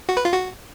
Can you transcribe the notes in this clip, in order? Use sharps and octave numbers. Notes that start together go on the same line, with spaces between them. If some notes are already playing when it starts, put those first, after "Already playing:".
F#4
B4
F4
F#4